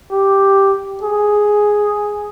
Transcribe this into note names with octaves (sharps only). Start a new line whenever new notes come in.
G4
G#4